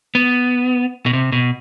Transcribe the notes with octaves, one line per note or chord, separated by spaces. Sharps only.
B3
B2
C3
B2